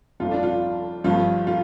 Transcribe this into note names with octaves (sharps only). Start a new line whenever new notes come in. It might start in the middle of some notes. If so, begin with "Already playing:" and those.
G1 F2 F3 F4
D4
F4
G1 G2 F3 F4
F4